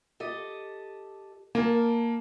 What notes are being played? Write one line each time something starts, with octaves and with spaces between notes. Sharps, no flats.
G4 A4 D#5
A#3 A#4 G#5 A5